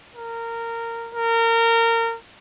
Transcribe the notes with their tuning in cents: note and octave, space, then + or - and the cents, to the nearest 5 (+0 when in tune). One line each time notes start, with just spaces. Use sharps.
A#4 -15
A#4 -25